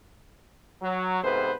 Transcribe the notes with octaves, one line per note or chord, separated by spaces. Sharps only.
F#3
G#2 C3 B3 A4 B4 C5